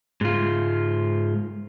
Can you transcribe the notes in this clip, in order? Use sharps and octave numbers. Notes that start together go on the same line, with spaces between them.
G#2 F4